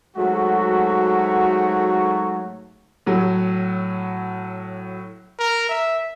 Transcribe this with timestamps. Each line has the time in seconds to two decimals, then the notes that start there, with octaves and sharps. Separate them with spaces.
0.17 G#2 F#3 A3 F#4
3.06 A2 F#3
5.39 A#4
5.69 E5